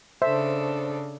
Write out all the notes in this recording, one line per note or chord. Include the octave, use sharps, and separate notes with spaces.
C#3 D4 A4 C5 E5